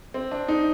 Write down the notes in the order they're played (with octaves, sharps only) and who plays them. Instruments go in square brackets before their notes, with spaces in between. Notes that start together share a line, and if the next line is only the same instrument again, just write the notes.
[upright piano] C4
D4
D#4